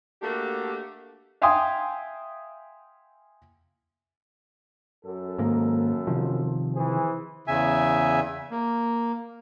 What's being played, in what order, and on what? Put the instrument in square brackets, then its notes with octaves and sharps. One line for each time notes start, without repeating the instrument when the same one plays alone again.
[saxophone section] A3 A#3 D4 F#4 G4
[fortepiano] E5 F5 G5 G#5 C6 D#6
[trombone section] F#2 A4
[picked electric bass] G#2 D#3 A#3
C3 D#3 F3
[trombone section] E3 G#4 C5
[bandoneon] E2 C#3 E5 G#5
A#3